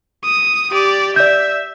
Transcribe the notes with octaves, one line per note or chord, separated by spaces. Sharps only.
D#6
G4 D5
D5 E5 G6